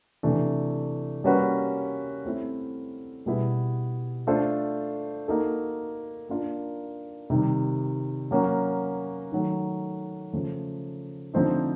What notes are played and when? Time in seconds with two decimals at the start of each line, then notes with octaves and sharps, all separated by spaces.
0.23 C3 E3 A3 D4
1.24 G3 A#3 C#4 F#4 B4
2.25 A3 C4 E4
3.26 B2 G3 B3 E4 G#4
4.27 A3 D4 F4 A4 C5
5.28 A#3 D#4 F#4 A4
6.29 A#3 D4 F4 A#4
7.30 C3 D#3 G3
8.31 F#3 A#3 C#4 F#4
9.32 D#3 F#3 A3
10.33 C#3 F3 A3
11.33 D3 F3 A3 C4 D#4